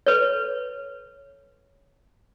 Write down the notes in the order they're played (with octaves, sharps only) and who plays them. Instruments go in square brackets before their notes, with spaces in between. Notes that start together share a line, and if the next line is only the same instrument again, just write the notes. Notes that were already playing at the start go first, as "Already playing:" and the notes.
[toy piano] A4 B4 C#5